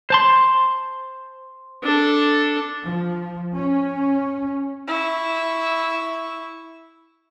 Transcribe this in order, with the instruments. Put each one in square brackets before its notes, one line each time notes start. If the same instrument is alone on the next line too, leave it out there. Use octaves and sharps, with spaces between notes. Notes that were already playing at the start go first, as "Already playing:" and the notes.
[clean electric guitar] C5 A5 C6
[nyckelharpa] D4 A4
[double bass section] F3
C#4
[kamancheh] E4 C#6